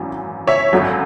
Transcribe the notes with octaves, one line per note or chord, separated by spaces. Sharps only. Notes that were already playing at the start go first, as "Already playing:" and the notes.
Already playing: G#1 F#2 E3
C#5 E5
G#1 F#2 D3 F#3